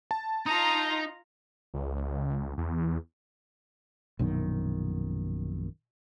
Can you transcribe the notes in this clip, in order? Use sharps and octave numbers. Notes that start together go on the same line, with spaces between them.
A5
D#4 F4 D#5 A#5
C#2
E2
A#1 F#2 B2 D#3